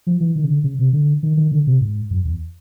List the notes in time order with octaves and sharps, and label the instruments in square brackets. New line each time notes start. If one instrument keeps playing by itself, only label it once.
[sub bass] F3
E3
D#3
C#3
D3
C#3
C3
D3
D#3
D#3
D3
C3
G#2
F#2
E2